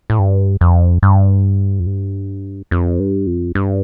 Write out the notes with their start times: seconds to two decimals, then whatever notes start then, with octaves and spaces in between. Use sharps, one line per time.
0.10 A2
0.19 G2
0.61 F2
1.03 G2
1.80 F2
1.87 G2
2.71 F2
3.00 G2
3.27 F2
3.55 G2